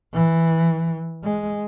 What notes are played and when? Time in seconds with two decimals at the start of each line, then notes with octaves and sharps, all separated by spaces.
0.14 E3
1.24 G#3